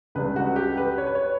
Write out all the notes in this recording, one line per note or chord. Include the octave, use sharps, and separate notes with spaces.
C#2 C#3 G3 D4 B4
F#4
G4
B4
C#5
B4
C#5